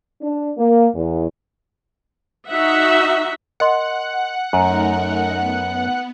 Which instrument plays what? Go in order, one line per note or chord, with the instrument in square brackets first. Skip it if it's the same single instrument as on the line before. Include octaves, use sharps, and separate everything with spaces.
[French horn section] D4
A#3
E2
[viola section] D#4 F#4 E5 F#5
[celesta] A#4 D#5 C6 [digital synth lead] F#5
[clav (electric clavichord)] F#2 [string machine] A3 D#4 A#4 [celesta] G#5 A#5
[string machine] B3